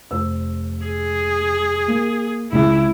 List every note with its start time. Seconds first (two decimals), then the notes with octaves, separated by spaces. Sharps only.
0.11 F1 C5 E6
0.85 G#4
1.88 A#3
2.52 C#2 C#3 E4